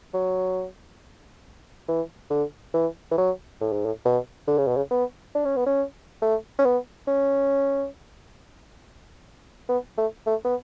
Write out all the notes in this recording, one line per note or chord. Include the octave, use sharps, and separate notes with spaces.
F#3
E3
D3
E3
E3
F#3
A2
G#2
A2
B2
D3
C#3
B2
C#3
B3
D4
C#4
B3
C#4
A3
C#4
B3
C#4
B3
A3
A3
B3